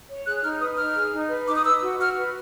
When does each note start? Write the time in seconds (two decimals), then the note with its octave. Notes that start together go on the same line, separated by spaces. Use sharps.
0.09 C#5
0.25 G#4 F#6
0.43 D#4 F6
0.60 B4 D#6
0.77 D#4 F6
0.95 G#4
1.12 D#4
1.29 B4
1.46 D#4 D6
1.55 D#6
1.64 B4 E6
1.82 F#4
1.99 F#4 F6
2.16 B4